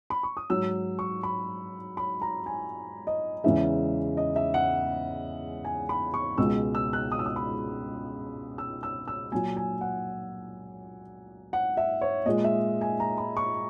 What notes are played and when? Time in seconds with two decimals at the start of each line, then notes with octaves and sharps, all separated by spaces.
0.10 B5
0.23 C#6
0.37 D#6
0.50 G#2 F#3 E6
0.99 C#6
1.23 B5
1.97 B5
2.22 A#5
2.46 G#5
3.07 D#5
3.44 E2 C#3 E3 G#3 E5
4.17 D#5
4.36 E5
4.54 F#5
5.65 G#5
5.89 B5
6.14 C#6
6.38 C#2 B2 G#3 E6
6.75 E6
6.93 F#6
7.12 D#6
7.19 E6
7.26 D#6
7.36 B5
8.58 E6
8.83 E6
9.08 E6
9.32 A#2 F#3 G#5
9.57 G#5
9.81 F#5
11.53 F#5
11.77 E5
12.01 C#5
12.26 A#2 G#3 D#5
12.44 E5
12.81 G#5
13.00 A#5
13.18 B5
13.37 C#6